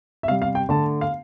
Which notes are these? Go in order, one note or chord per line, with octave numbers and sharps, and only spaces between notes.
E5
C3 G3 F5
F5
G5
D3 A3 A5
F5